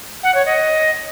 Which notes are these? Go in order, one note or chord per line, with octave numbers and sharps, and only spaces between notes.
F#5
C#5
D#5